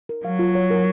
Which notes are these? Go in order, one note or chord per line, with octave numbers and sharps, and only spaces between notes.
A#4
F#3 F5
F4
C#5
A#4